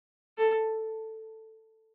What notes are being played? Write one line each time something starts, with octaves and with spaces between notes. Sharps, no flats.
A4